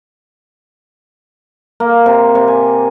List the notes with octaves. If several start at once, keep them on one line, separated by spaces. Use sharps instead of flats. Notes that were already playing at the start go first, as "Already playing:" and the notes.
A#3
C3
C3
G#5